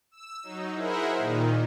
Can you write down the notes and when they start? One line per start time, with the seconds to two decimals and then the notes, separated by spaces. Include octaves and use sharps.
0.11 E6
0.43 F#3 D#4
0.74 E4 G#4 A#4 C5 E5 F#5
1.16 A#2 D#3 D#4